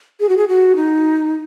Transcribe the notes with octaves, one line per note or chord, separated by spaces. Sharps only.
G#4
F#4
G#4
F#4
D#4